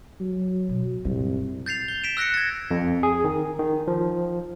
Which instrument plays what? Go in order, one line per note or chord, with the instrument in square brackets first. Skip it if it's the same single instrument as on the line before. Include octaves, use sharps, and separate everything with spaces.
[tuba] F#3
[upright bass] B2
[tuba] C2 [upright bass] F#2 A#2
[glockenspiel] G6 A6 C7 F7
G7
B6 D7 E7
E6 F#6 A#6 B6 C#7
G#6 A6
[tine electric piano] F2
G#4
D#3
D#3
F3